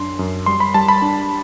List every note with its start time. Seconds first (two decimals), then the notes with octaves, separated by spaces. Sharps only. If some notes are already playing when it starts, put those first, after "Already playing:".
Already playing: F#2 D4 C6
0.19 F#2
0.46 G3 C6
0.60 B5
0.74 G3 A5
0.88 B5
1.02 D4